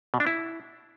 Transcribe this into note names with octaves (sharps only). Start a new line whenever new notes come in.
B2
D4
E4